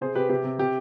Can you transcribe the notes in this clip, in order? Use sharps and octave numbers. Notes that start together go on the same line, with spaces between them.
C3 G#4 C5
C3 G4 B4
C3 G4
C3
C3 G4